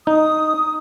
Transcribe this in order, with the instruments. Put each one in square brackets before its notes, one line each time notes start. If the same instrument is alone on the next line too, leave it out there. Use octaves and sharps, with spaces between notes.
[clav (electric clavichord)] D#4 [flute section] D#6